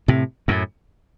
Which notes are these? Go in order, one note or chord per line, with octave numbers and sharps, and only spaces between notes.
A2 C3
F#2 A2